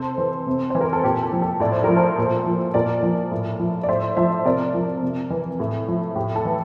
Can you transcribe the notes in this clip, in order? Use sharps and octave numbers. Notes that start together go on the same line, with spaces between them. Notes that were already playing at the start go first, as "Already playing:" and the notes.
Already playing: C3 A4 C5
E3
C3
E3 C5
A#4
A4
A#2 G4
A4
F3
A4
A2 D5
C5
F3 A#4
A4 C5
A#2
F3
A#2 A#4 D5
F3
A2
F3
D5
A2 C5 E5
F3 C5 E5
C3 A#4 D5
F3
C3
E3
A2
F3
A2 G4
A4
E3